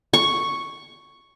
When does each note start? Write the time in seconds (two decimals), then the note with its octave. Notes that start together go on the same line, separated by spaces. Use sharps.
0.13 C#6